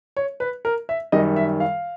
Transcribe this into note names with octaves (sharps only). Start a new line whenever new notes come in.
C#5
B4
A#4
E5
F#2 D#3 G3 D#5
E5
F5